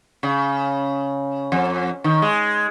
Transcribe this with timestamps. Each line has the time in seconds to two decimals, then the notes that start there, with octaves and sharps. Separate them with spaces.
0.23 C#3
1.52 F2
2.04 D#3
2.22 G#3